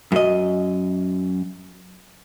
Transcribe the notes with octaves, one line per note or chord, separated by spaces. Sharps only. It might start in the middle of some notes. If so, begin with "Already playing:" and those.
F#2 D#5